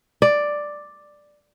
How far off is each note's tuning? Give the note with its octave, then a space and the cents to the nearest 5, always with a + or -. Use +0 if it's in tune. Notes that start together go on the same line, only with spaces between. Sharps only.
D5 +5